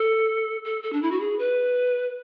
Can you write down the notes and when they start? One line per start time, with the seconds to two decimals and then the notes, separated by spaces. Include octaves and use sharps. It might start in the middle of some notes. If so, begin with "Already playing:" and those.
Already playing: A4
0.65 A4
0.83 A4
0.93 D4
1.02 E4
1.11 F#4
1.20 G#4
1.39 B4